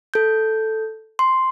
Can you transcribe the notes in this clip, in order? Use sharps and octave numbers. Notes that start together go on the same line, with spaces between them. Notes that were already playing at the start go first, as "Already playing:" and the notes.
A4 G6
C6